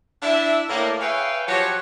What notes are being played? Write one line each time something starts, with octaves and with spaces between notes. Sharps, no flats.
D4 E4 E5
A2 A#3
G#4 B4 C#5 E5 F5 G5
F3 F#3 F#4 G4 C#5